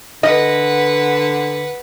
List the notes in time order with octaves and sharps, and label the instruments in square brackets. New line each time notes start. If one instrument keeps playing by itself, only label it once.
[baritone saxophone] D3 [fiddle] B4 F#5 [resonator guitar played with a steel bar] D#5